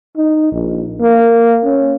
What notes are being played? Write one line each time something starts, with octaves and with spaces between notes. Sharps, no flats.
D#4
A#1
A#3
C#4